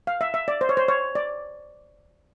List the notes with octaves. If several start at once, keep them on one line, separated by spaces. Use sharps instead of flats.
F5
E5
E5
D5
C5
C#5
C5
C#5
D5